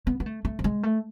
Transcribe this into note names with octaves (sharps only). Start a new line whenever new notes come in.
B3
B3
A3
A3
F3
G#3
A3